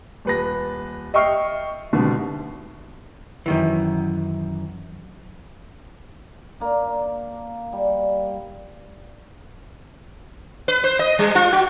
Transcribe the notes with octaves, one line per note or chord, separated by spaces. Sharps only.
D#1 B4 A#6
D#5 E5 G5 C#6 F6 C7
C2 G#2 B2 D3 D#3
F#2 D#3 E3
A#3 D4
G3
B4
C5
D#5
G3
F4
F#4